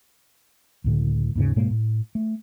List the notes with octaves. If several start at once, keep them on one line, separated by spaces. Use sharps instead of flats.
C#2 A2 D3
D#2 G#2 C#3
G#2 B2 G#3 A#3
A2
A3